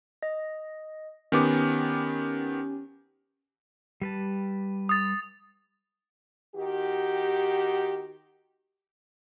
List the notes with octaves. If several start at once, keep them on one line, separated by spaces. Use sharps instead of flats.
D#5
D#3 B3 C#4 G4 D6
G3 B4 A5
D#6 A6
D#3 F#4 G4